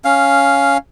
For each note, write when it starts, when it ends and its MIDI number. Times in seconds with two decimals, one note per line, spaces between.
0.05 0.77 61
0.05 0.77 77